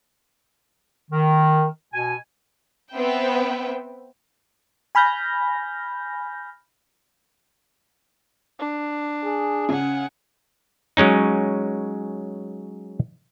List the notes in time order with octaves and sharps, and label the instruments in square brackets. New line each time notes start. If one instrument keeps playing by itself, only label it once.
[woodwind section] D#3
B2 G#5
[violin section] B3 C4 B4 E5 G5
[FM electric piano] G#5 B5 F6 G6 A#6
[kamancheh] D4
[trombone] G#4
[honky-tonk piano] C#3 [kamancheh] F#5 G#5
[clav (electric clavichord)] F#3 G#3 C#4 D#4